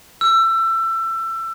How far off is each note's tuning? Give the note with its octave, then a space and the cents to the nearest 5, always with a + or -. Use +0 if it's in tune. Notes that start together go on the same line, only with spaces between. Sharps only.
E6 +25